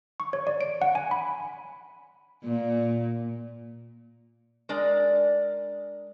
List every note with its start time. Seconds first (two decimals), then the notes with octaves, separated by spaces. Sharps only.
0.20 C#6
0.33 C#5
0.47 D5
0.61 D7
0.82 F#5
0.95 G#5
1.11 B5
2.44 A#2
4.69 G#3 D4 A#4 D5